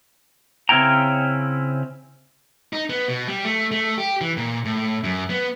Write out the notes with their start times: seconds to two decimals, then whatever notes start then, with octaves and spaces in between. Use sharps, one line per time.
0.69 C#3 C4 C#4 E4 G5 A#5
2.73 D#4
2.90 B3
3.08 B2
3.28 G3
3.45 A3
3.72 A3
3.98 G4
4.21 E3
4.37 A#2
4.65 A2
5.04 F#2
5.30 B3